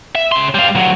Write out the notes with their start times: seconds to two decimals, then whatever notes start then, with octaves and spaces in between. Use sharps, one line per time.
0.15 E5
0.32 C#3 C6
0.55 G3 F5
0.75 D2 F#3